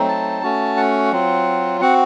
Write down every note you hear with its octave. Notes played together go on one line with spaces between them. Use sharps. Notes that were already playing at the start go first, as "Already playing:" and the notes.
Already playing: F#3 A3 C4 D#4
A5
A3 C#4 F#4
F#5
F#3 C4 F4
C4 F#4 F#5